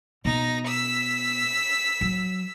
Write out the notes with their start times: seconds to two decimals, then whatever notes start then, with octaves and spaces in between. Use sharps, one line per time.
0.25 B2 D#4 A#6
0.67 E6 B6
2.01 F#3